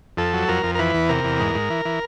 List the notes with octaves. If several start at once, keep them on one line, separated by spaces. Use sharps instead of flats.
F2 A4
F#3
F2 A#4
F2
A#4
E3 B4
E2
C3 A#4
E2
G#2
G#2
E3
E3